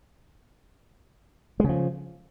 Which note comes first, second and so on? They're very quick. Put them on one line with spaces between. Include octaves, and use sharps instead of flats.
G#3 C#3 F3